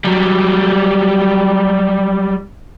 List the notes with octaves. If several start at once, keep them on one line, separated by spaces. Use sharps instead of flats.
F#3 G3